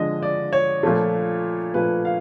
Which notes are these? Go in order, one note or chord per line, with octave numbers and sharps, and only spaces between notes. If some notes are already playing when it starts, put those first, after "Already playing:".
Already playing: D3 F3 G#3 D#5
D5
C#5
A#2 F3 A3
A#2 F3 A3 B4
F5